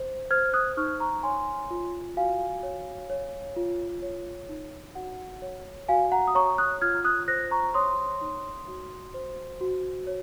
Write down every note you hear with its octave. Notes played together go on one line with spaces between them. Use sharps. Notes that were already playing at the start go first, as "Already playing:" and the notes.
Already playing: C5
C5 F6 G#6
D#6 F#6
D#4 C#6 F6
A#5 C#6
C#5 G#5 C6
F4
F#4 F5 G#5
C#5
C#5
F4
C#5
D#4
F#4 F#5
C#5
F#4 F5 G#5
F#5 A#5
D#6
C#5 A#5 C#6
D#6 F#6
F4 F6 G#6
D#6 F#6
C5 F#6 A#6
A#5 C#6
C#5 C6 D#6
D#4
F#4
C5
F#4
C#5